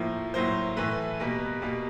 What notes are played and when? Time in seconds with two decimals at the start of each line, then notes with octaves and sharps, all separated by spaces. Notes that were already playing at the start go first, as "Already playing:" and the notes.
Already playing: A2 F3 A#3
0.34 A2 F#3 A#3 C5
0.77 A2 E3 A3 B4
1.20 B2 G3 A#3
1.62 B2 G3 A#3